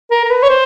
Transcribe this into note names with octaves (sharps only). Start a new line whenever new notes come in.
A#4
A#4
B4
C#5
C5